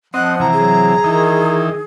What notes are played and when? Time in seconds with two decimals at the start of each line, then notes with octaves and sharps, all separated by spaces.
0.14 F3 C4 D#5 F#5 F#6
0.40 C3 E3 A#5
0.53 F#3 G#4
1.04 D#3 E3 D#4